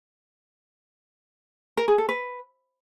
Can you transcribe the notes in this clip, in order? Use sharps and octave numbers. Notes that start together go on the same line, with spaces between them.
A#4
G#4
A4
B4